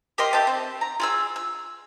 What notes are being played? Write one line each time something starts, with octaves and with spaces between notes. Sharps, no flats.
G4 A#4 D#5 C6
G4 E5 A5
C4
A#5
F4 G#4 E6
E6